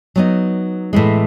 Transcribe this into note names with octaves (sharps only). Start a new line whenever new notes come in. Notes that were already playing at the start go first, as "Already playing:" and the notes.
F#3 B3 D#4
A2 E3 G#3